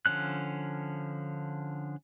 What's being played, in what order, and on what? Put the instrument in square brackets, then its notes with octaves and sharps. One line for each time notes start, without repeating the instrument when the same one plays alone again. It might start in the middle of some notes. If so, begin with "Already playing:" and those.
[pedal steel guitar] D3 F3 C#4 F#6